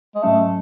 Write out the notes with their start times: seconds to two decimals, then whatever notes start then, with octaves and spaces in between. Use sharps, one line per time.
0.15 G#3
0.23 G#2 F#3 A3 C#4